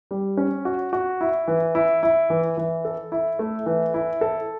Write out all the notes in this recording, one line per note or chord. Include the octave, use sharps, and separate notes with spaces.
G3
C#4
F#4
F#4
E4
E3
E4
E4
E3
E3
A4
E4
A3
E3
E4
A4